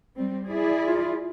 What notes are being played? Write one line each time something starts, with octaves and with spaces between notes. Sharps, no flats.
G3 C4
E4 G#4 D5
F4